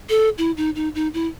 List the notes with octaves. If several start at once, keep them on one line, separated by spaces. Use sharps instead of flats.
A4
E4
D#4
D#4
D#4
E4